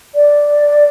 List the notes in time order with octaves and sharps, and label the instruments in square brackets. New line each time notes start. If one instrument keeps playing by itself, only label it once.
[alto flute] D5